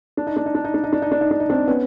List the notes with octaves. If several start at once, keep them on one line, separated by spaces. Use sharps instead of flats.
D4
D#4
D4
D#4
D4
D#4
D4
D#4
D4
D#4
D4
D#4
D4
D#4
C4 D4
B3 C#4